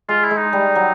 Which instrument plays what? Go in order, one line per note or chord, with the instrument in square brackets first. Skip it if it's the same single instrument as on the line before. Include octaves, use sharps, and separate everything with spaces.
[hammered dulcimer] G#3 [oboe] F4
[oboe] E4
[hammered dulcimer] G#3
[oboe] D#4
[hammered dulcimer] G3
F#3